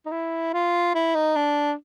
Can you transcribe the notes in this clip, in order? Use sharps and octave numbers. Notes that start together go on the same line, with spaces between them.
D#4
E4
F4
E4
D#4
D4